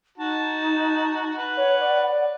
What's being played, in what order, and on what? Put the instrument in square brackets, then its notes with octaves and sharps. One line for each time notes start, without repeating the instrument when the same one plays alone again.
[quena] D#4 [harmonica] F#4 A5
[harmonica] B4
[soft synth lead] C#5 [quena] F#5
[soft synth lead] D5